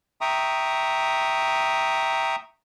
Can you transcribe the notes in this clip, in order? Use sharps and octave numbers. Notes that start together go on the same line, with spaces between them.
E5 G5 A#5 C#6 D#6